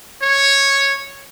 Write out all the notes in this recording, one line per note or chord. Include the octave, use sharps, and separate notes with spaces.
C#5